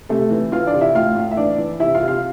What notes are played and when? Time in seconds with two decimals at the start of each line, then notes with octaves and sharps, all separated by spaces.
0.09 C3 A3 A4
0.31 E3
0.52 E3 F4 F5
0.66 D4 D5
0.73 C3
0.81 E4 E5
0.95 A2 F4 F5
1.16 A2
1.31 E5
1.37 E3 D4 D5
1.58 E3
1.79 C3 E4 E5
1.95 F4 F5
2.01 C3
2.08 F4 F5